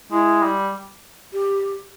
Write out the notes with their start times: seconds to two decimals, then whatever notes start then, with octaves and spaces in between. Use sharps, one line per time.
0.11 G#3 E4
0.42 G3
1.33 G4